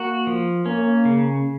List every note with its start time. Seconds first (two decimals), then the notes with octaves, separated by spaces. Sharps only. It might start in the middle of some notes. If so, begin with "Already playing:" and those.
Already playing: A#3 F#4
0.27 F3
0.66 A#3 C#4
1.05 C#3